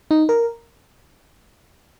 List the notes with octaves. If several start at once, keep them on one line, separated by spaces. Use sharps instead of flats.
D#4
A#4